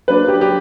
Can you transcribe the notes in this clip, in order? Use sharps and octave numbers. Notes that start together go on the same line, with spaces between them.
F#3 A#3 D4 B4
G4
G4